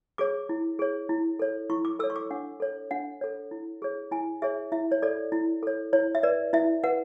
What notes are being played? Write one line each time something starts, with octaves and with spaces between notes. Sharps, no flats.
G#4 C#5 D6
E4
G#4 C#5
E4
A4 C#5
E4 C#6
D6
A4 C#5 E6
C#6
D6
D4 F#5
A4 C#5
D4 F#5
A4 C#5
E4
G#4 C#5
E4 G#5
G#4 C#5 E5
E4 E5
C#5
A4 C#5 D5
E4
A4 C#5
E4 C#5
E5
B4 D5
E4 E5
B4 F#5